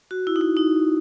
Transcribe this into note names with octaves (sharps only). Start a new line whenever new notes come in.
F#4
E4
D#4
E4
D#4